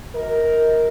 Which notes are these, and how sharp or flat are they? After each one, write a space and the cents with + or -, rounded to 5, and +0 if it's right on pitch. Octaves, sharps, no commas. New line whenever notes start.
F#4 +10 A#4 +0 D#5 +35